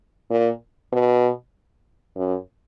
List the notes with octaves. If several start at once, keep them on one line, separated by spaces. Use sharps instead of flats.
A#2
B2
F#2